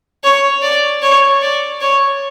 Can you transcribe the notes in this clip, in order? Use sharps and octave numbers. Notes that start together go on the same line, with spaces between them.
C#5
D5
C#5
D5
C#5